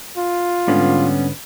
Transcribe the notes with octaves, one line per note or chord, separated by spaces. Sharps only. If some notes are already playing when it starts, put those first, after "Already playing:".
F4
G#2 D3 G3 B3 C#4